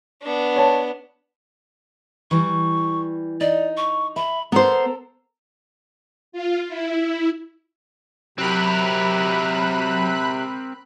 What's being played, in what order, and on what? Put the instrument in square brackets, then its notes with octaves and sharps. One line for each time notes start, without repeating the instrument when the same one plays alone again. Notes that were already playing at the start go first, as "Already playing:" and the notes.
[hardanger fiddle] B3 D4
[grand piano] C#5 A5
[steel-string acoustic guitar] E3 G3 [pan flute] C#6
[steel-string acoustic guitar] D#4 [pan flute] D5
[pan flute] C#6
[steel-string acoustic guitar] E5 [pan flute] B5
[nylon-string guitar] B3 C5 [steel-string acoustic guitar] A4 A#4 [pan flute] A#5
[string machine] F4
E4
[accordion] C3 [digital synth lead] F#3 [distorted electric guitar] C4 A#4 [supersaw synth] B5 F#6